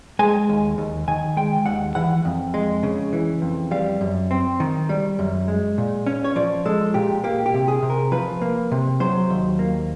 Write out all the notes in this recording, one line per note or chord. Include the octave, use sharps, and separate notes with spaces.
G#3 G#5
D#2
D#2
D#3 G#5
G#3 G5
D#2 F#5
E3 F#5
F2
G#3
C#3
E3
F2
G3 F5
F#2
C4
D#3
G3
F#2
G#3
A#2
C#4
C#5
F3 D5
G#3 A4
A#2 G4
A#3 G4
G4
C3
G#4
C3
A#4
F3 B4
A#3
C3
F#3 C5
D#2
A#3